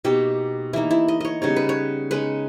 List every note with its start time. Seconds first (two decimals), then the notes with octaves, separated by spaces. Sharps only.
0.04 B2 A#3 D#4 G4
0.73 E3 A#3 D#4 E4
0.91 E4
1.08 D#5
1.21 C#5 D#5
1.42 C#3 G3 B3 D#4 C#5
1.56 B4
1.69 C#5
2.11 C#3 G#3 D#4 B4